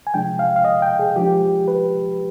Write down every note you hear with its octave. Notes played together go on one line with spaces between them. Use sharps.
G#5
C3 F3 G#3 D4 G5
F5
F5
D#5
G5
G#4
F3 G#3 D4 G4
B4